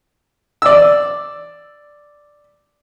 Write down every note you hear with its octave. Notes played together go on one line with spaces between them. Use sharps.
D5 E6